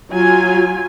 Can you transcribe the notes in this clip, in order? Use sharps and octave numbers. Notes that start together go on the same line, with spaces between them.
F#3 F4 G#5